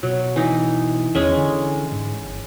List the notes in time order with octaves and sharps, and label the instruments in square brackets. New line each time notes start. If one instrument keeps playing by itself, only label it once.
[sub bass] B2 [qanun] F#3
[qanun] E3 D#4 E4
[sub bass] E2 [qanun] G#3 C#4 E5
[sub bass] D3
G#2
G1